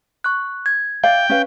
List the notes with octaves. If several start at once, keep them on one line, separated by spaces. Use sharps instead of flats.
C#6 F#6
G#6
D5 F5 G5
C#4 B4 F5